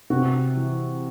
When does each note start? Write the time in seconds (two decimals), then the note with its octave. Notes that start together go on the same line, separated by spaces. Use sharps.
0.10 C3 F#4
0.56 E3